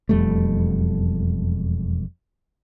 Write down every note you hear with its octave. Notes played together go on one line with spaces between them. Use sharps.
E1 F2 G3 A3